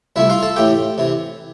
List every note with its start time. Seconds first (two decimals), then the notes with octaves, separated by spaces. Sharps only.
0.16 C2 C3 F3 A3 E4 E5
0.30 F4 F5
0.43 A4 A5
0.56 A2 E3 A3 G4 G5
0.98 C3 E3